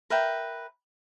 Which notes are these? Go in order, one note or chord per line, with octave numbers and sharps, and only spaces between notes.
A#4 B4 E5 G5